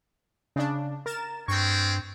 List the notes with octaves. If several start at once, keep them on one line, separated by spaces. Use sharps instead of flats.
C#3 D4
A#4 A6 E7
G2 G3 G#3 C4 C#6